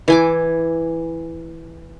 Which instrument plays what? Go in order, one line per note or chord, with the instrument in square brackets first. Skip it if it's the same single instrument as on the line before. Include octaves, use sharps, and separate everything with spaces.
[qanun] E3 G#5 D6